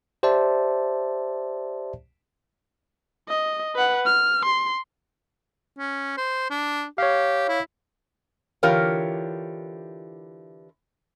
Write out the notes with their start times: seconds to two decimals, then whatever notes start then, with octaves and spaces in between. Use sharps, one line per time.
0.23 G4 C5 D5 E5 A5
3.28 D#5
3.75 B4 F#5
4.06 F6
4.46 C6
5.79 C#4
6.17 C5
6.50 D4
6.98 G4 C#5 F5
7.48 E4
8.63 D3 E3 F4 G4 A#4 C#5